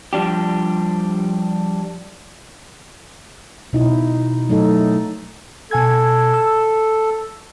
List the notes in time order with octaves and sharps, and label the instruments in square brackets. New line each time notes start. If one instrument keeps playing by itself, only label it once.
[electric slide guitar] F3 G3 D4 G4
[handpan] B2 D#4 E4
F#3 A3 D#4 A4
[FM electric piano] B2 G#5 G#6 [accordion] A4
[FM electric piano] E6